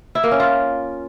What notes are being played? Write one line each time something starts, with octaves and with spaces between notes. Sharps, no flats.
E4
A#3
C#4
F4